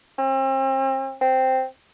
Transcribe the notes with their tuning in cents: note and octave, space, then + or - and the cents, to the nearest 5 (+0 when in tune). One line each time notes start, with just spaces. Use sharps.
C4 +40
C4 -5